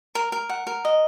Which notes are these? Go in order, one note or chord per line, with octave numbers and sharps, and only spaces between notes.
A#4
A#4
F#5
A#4
D#5